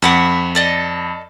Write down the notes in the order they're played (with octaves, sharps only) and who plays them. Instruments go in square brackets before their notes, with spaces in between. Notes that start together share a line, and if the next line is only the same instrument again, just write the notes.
[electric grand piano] F2 B5 [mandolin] E5 F#5 D6
[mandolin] A4 D5 D#5